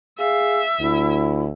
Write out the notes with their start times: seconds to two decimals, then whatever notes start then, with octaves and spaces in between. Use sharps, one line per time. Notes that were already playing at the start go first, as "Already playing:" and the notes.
0.19 G#4 E5 F5
0.80 D2 E4